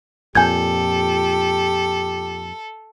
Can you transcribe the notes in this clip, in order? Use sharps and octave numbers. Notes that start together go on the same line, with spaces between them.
F2 A#2 G4 A4 G#5 G6 G#6